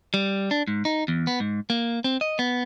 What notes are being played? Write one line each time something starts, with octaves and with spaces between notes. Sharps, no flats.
G3
D4
G#2
D#4
E2
B3
G#2
A#3
C4
D#5
B3